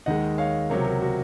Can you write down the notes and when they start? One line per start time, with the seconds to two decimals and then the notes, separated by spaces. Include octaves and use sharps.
0.06 D#2 D#3 G#3 D#5 F#5
0.38 C#5 F5
0.70 C#2 C3 F#3 A#4 C#5
0.85 F#4 A#4
1.01 F#4 A#4